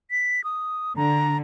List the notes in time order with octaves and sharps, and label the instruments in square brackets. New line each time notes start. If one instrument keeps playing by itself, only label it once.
[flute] B6
D#6
[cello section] D3 [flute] A#5